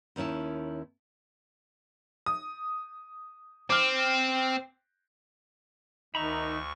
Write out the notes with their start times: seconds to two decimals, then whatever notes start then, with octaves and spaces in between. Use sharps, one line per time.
0.16 D#2 D#3 C#4 E4 A5
2.26 D#6
3.70 C4 D6 F6
6.15 D2 D#3 D#4 E5 A#5 B5 C#6